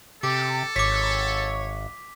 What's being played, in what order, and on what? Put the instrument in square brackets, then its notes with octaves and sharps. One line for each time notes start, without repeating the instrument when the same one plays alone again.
[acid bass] C3 [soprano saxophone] G4 [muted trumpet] A4 [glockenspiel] D6
[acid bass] G#1 [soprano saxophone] C#5 [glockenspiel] D6 B6